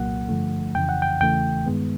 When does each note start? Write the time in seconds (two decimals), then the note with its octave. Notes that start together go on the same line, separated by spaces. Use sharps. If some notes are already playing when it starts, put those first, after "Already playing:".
Already playing: C2 A#2 F#3 A#3 F#5
0.29 G2 D3 F3 A3
0.75 F2 C#3 E3 G5
0.89 F#5
1.02 G5
1.21 E2 C#3 E3 A3 G5
1.66 G2 D#3 G#3 B3